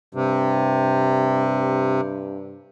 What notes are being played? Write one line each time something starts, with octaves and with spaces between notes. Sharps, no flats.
G2 C3